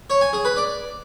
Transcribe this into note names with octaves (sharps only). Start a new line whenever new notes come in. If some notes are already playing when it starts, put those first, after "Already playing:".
C#5
G#5
G#4
B4
D5